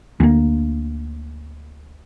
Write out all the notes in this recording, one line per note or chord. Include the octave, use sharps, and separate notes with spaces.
D2 A#3